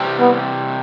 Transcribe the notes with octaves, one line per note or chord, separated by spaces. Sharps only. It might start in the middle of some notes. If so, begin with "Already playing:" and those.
Already playing: C3 E3 G3 C4
B3